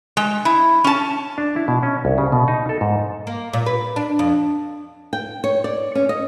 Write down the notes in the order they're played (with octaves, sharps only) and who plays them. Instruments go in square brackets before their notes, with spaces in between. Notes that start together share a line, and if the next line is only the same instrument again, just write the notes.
[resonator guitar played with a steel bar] G#3
E4
C#4 A5
[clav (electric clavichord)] D4
E4
B2
C#4
C2
C#3
B2
D#4
A4
G#2
[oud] A#3
A#2
B4
D4
F2
[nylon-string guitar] G5
C#5
D5
C#4
D#5